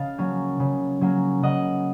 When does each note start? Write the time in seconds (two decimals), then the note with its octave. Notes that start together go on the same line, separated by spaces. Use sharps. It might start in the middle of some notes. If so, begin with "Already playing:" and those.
Already playing: C#3 D#5 F5 A5
0.18 F#3 A#3 C#4
0.60 C#3
1.01 F#3 A#3 C#4
1.42 C#3 D#5 F#5